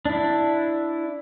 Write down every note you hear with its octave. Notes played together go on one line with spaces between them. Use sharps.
D4 E4